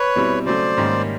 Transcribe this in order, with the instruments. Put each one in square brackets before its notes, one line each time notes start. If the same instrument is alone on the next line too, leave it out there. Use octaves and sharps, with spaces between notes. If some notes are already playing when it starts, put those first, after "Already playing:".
Already playing: [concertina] B4 C#5
[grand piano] B2 G3 C4 E4
[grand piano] C#3 F#3 A3 [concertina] C5 D5
[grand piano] G#2 D#3 G3 A#3 C#4